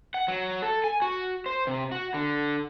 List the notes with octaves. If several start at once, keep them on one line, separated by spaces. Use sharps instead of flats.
F#5
F#3
A4
G#5
F#4
C5
C3
F#4
D3